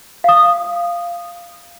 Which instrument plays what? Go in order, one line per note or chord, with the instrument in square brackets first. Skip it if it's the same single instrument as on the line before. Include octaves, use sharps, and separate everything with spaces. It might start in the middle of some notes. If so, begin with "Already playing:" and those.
[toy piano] F5 D#6